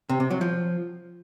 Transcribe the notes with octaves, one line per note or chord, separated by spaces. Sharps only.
C3
C3
F#3
F3